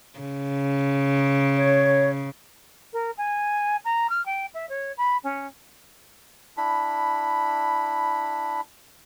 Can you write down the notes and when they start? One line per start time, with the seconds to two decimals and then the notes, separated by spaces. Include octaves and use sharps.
0.19 C#3
1.56 C#5
2.92 A#4
3.17 G#5
3.84 A#5
4.09 F6
4.25 G5
4.53 E5
4.69 C#5
4.97 B5
5.23 C#4
6.57 D4 E4 B5